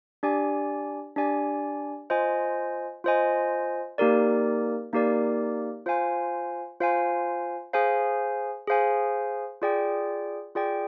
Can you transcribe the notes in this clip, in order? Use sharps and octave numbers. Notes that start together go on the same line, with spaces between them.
D4 G4 D5 G#5
D4 G4 D5 G#5
F4 C5 D#5 G#5
F4 C5 D#5 G#5
A#3 D#4 G4 A#4 D5
A#3 D#4 G4 A#4 D5
F4 C5 F5 G#5
F4 C5 F5 G#5
G#4 C5 F5 G#5
G#4 C5 F5 G#5
F4 G#4 D5 G5
F4 G#4 D5 G5